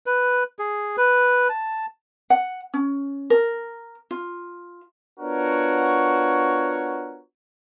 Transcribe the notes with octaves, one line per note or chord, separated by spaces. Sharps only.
B4
G#4
B4
A5
F#5
C#4
A#4
F4
B3 D4 F4 F#4 A#4 C#5